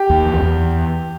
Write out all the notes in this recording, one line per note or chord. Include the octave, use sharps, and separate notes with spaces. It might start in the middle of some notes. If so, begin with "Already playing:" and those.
Already playing: G4
D#2
E2
E2